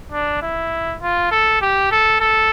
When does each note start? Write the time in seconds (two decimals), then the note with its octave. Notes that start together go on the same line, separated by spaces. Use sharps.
0.12 D4
0.42 E4
1.02 F4
1.31 A4
1.61 G4
1.91 A4
2.20 A4